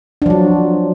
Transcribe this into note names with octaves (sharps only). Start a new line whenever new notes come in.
F3 F#3 D4